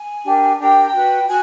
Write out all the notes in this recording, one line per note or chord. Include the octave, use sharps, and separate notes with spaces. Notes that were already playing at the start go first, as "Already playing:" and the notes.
Already playing: G#5
D4 G4 A#4
D4 G4 A#4 G5
F#4 B4
F#4 G#5